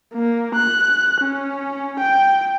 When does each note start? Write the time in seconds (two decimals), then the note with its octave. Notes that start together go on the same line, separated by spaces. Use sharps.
0.14 A#3
0.55 F#6
1.21 C#4
2.00 G5